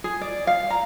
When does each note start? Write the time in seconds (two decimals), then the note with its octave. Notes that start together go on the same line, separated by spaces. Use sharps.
0.04 G#4
0.21 D5
0.47 F5
0.70 A#5